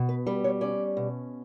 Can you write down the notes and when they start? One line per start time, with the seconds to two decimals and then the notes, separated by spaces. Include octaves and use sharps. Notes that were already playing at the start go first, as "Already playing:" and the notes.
Already playing: B2
0.09 B4
0.27 G3 B4
0.44 C#5
0.61 C#4 D5
0.97 B2